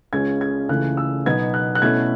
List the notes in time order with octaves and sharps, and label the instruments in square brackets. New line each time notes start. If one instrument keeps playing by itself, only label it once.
[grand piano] C#2 C#3 G#3 C#4 G#6
G#6
C#2 C#3 E3 A3 F#6
E6
B2 F#3 B3 D#4 G#6
F#6
F#6
B2 A3 C#4 E4 G#6